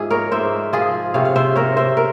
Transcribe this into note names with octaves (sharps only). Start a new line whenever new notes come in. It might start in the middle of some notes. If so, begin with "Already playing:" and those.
Already playing: G#2 F3 G#4 E5
A#4 C#5
G#2 C5 E5
F3 F4 G#4
C3 C#5 F5
F5
C5 E5
C3 A#4 C#5
C5 E5
A#4